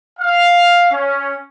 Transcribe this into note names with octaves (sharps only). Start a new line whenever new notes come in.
F5
C#4